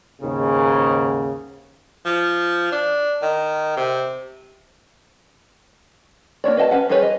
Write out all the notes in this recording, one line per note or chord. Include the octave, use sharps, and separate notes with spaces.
D#2 G#2 C#3
F3
D4
D#3
C3
A#3 D4 C#5 D5
B4 D#5 G5 A5
C#4 B4 F#5
G3 F4 G#4 B4 C#5
D#5